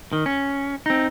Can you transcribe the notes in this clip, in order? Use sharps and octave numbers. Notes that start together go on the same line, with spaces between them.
D#3
C#4
C4 D#4